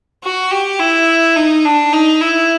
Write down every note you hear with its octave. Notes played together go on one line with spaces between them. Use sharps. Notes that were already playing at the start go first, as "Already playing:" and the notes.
F#4
G4
E4
D#4
D4
D#4
E4